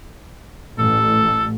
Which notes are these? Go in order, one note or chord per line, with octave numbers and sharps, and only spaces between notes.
A1 A4